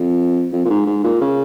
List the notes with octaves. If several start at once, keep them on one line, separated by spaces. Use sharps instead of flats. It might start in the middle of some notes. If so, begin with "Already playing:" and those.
Already playing: F2
F2
A#2
G#2
G#2
A#2
C#3